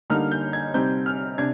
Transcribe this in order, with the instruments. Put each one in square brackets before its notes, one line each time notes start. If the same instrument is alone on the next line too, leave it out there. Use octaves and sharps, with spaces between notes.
[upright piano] D3 G3 A#3 D#4 F6
G6
G#6
C3 G3 C4 D#4 G6
F6
C3 D4 G#6